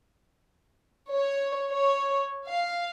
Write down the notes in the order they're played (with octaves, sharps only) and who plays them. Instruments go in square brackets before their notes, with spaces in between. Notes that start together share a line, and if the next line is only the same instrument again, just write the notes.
[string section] C#5
C#5
F5